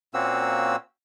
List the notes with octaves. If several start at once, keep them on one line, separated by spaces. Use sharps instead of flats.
A#2 A#3 C4 C#4 F#4 E6